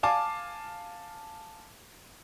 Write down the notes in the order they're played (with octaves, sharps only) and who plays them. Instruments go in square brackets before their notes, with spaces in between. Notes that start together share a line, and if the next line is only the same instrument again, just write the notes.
[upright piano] F5 G#5 A5 D6